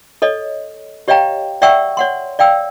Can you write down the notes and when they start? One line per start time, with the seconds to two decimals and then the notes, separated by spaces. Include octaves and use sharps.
0.22 A4 C#5 D#5
1.08 G4 C#5 D#5 F5 G5 A#5
1.62 D5 E5 F#5 G5 C#6 E6
1.97 C#5 F#5 C6
2.39 D5 F5 G5 E6